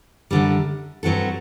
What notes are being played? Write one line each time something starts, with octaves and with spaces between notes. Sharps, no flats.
F#2 D3 G3
G2 F#3 C4 F#4 A4